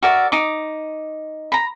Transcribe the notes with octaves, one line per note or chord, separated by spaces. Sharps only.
F#4 A#4 D5 E5
D#4 D6
A#5 B5